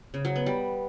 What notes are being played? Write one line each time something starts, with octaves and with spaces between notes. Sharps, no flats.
C#3
F#3
B3
G3